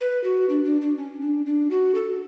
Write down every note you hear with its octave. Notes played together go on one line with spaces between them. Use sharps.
B4
F#4
D4
D4
D4
C#4
D4
D4
F#4
A4